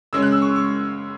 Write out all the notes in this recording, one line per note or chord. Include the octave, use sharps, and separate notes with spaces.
C#3 G#3 C#4 E6
F#6
E6
C#6
C#6